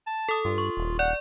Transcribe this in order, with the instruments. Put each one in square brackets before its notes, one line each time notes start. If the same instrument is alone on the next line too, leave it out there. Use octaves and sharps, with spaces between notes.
[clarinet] A5
[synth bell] A4 D#6
[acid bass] G2 [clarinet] F4
[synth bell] C#6
[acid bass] D#1
[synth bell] D5 [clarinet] F#5